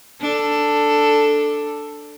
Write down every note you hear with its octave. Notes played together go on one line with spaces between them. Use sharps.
D4 A4